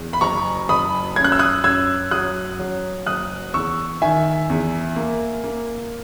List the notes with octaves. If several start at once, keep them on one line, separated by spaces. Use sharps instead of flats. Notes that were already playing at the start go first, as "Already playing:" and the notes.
Already playing: E2
B5
F#1 A#5 C#6
F#1 B5 D#6
F#2 G#6
F#6
E6
D#6 F#6
F#2 E6 G#6
F#3 D#6 F#6
F#3
F#1 D#6 F#6
E2 C#6 E6
D#3 E5 G#5
E2
A#3
A#3